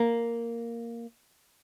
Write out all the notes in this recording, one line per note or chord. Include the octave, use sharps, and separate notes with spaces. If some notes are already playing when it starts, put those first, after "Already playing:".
Already playing: A#3